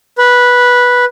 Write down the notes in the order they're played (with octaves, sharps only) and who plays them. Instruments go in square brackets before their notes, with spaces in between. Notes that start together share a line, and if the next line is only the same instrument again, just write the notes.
[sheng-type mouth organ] B4